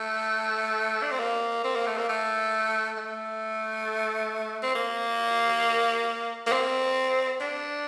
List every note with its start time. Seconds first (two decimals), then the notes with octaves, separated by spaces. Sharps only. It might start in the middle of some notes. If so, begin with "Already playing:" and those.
Already playing: A3
1.03 D4
1.11 C4
1.20 A#3
1.64 C4
1.76 A#3
1.87 A3
1.98 A#3
2.09 A3
2.97 A3
4.63 C4
4.75 A#3
6.47 A#3
6.53 C4
7.41 D4